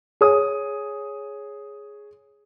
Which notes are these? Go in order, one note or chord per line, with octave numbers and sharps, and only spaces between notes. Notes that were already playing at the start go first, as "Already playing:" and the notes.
G#4 C#5 D#6